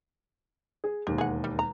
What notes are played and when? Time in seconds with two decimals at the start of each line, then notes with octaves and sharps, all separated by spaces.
0.84 G#4
1.07 E1 D#2 G4
1.18 G#4 F#5
1.44 G3
1.59 A#5